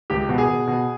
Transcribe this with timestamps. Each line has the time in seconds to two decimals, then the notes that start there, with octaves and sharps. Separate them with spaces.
0.10 C#2 G4
0.29 B2
0.38 G#4
0.48 B2
0.67 B2